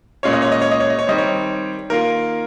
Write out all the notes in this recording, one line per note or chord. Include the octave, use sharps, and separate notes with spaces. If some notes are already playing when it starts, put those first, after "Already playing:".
A#2 G#3 C#4 F4 C#5
D#5
C#5
D#5
C#5
D#5
C#5
D#5
C#5
D#3 G3 C4 D#5
C#5
D#3 A#3 F4 A#4